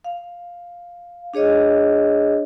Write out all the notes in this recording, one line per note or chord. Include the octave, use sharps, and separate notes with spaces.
F5
D4 G#4 C#5 D#5